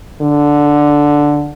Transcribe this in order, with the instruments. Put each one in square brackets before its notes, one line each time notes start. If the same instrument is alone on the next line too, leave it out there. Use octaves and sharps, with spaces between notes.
[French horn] D3